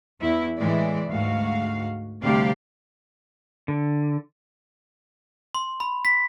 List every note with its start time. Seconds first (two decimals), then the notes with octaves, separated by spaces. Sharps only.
0.21 E2 E4
0.59 A2 E3 G#3 D5
1.08 D2 G#2 F#4 F5
2.22 D2 C3 G3 G4 D5 F5
3.68 D3
5.55 C6
5.80 B5
6.05 B6